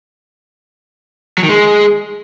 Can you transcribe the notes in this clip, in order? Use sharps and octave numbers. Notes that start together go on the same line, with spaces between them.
F#3
D#3
G#3